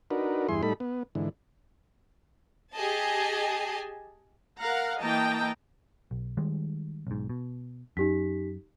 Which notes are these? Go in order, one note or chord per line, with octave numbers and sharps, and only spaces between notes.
D4 D#4 F#4 A#4 B4
E2 G2 E4 G#4 C6
A2 G3 D#4 A4 B5
B3
G#2 D3 E3
G4 G#4 D#5 G#5 A5
A#4 F5 F#5 A#5
E3 A#3 D#5 G5 A5 A#5
B1
D#3 G3 G#3
B1 G#2
B2
F#2 D#4 G4 B6